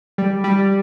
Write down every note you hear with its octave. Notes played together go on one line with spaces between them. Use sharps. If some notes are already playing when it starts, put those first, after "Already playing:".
G3
G3